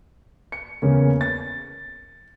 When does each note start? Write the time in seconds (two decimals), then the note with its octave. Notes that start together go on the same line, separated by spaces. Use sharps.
0.52 C#7
0.82 E2 C#3 A#3 C#4
1.21 A6